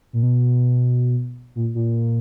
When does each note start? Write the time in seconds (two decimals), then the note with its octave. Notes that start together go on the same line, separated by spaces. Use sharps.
0.13 A#2
0.23 B2
1.55 A#2
1.75 A#2